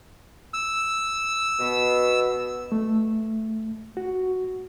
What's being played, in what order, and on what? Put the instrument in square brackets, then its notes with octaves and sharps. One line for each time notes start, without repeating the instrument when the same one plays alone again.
[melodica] E6
[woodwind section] B2
[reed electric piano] A3
F#4